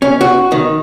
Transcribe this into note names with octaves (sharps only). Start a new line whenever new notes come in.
C#4
F#4
D#3